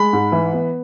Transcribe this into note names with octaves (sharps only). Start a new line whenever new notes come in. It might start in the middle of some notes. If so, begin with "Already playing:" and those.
Already playing: G#3 B5
G#2
E3
B3